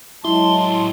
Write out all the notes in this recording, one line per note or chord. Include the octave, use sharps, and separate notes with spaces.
A2 F#3 G#3 E4 A5 C6